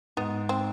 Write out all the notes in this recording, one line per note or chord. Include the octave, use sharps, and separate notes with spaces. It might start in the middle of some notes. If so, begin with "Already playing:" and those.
G#2 B3
C4